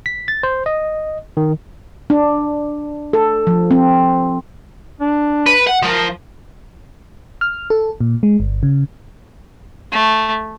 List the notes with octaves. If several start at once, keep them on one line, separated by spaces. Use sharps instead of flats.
B6
A6
C5
D#5
D#3
D4
A4
F3
C4
D4
B4
F#5
F3 A#4
F6
A4
A#2
G#3
G1
C#3
A3